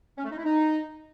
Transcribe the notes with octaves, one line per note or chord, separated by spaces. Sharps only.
C#4
A3
D#4
E4
D#4